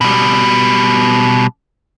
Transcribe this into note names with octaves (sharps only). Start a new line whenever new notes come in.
B2 G3